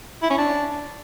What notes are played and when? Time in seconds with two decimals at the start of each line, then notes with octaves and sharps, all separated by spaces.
0.23 E4
0.30 C#4
0.38 D4